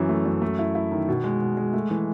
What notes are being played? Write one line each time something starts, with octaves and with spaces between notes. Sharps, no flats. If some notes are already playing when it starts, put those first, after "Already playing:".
Already playing: F#2 E3
A3
F#2
A3
E4
E4
D#3
B2
G#3
B2
G#3
A3
E3